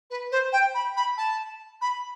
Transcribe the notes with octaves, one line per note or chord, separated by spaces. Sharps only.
B4
C5
G5
B5
B5
A5
B5